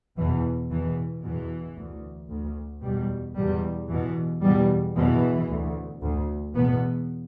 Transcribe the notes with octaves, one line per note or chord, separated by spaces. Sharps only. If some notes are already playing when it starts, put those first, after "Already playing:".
E2 B2 E3
E2 B2 E3
E2 B2 E3
D2
D2
E2 B2 G3
E2 B2 G3
E2 B2 E3
E2 B2 G3
E2 B2 E3
D2
D2
E2 B2 B3